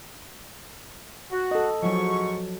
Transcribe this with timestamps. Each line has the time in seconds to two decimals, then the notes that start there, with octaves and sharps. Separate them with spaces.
1.31 F#4
1.51 A4 D#5
1.82 G#2 F3 F#3 C#6